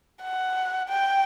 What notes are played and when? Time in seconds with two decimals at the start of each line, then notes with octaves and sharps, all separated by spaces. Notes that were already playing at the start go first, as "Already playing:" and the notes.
0.23 F#5
0.90 G5